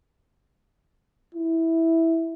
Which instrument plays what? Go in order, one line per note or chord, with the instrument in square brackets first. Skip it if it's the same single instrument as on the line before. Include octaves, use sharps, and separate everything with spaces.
[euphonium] E4